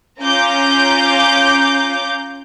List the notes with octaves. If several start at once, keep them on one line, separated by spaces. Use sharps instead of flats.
C#4 F4 A#5 D6 G6